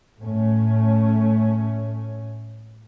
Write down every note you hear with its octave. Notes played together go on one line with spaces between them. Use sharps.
A2 A3 C#4